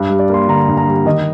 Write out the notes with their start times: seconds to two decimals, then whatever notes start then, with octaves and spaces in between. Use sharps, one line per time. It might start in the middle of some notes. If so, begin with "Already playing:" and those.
Already playing: G2
0.10 G3
0.19 D5
0.30 A#3 C6
0.48 D3 A#5
0.68 G2
0.77 A#5
0.87 G3
1.05 D#3 D#5